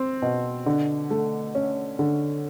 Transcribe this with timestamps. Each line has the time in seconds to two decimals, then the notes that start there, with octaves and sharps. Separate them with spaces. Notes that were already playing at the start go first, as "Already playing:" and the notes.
Already playing: C4
0.22 B2
0.66 D3
1.10 A3
1.55 C#4
1.99 D3